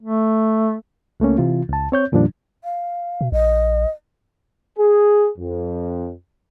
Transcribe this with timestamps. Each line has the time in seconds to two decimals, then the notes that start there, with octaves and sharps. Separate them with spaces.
0.01 A3
1.20 C#2 A3 A#3 C#4
1.38 C3 E3 F4
1.69 C#2 A5
1.92 C4 C#5 G6
2.12 F2 A#2 D#3 F3 G3 D4
2.64 F5
3.21 B2
3.32 A#1 D#5
4.78 G#4
5.38 F2